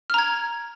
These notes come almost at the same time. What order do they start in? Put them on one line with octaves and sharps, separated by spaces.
F6 A#5 G#6